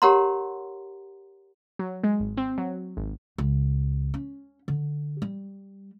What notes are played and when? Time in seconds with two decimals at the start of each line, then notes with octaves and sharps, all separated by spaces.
0.02 G4 A#4 C#5 F#5 A#5 C6
1.79 F#3
2.04 G#3
2.20 G#1
2.37 C4
2.58 F#3
2.97 G#1
3.38 C#2
4.14 C#4
4.68 D3
5.22 G3